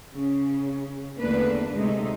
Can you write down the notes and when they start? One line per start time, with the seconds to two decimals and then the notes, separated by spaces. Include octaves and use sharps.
0.15 C#3
1.19 E2 D3 A3 A#3 D4 B4
1.76 D2 C3 G#3 A3 D#4